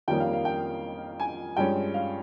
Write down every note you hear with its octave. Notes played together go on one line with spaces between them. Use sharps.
F2 D#3 G3 A#3 C#4 G5
F5
F5
G5
G#5
G2 F3 G#3 C#4 G5
F5